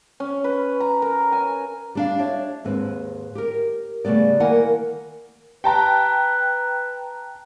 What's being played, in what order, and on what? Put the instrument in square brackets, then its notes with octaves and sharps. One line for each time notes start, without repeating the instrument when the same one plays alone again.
[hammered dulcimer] C#4
B4
A#5
A#4
G#5
[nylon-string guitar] G3 D4 F5
D4 C#5 E5
D#2 G#2 C4 B4
G4 A#4
C#3 G3 A3 B3 D5
D#3 A#3 E4 A#4 F#5 G#5
[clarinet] B4 [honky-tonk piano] G5 A5 A#5